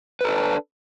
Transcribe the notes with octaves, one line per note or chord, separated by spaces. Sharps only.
D4 A4 B4